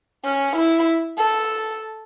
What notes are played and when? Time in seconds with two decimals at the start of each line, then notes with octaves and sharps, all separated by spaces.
0.25 C#4
0.56 E4
1.18 A4